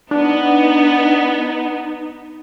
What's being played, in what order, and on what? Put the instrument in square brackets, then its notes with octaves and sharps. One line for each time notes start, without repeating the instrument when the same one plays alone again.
[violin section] B3 [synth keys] D4 [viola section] D#4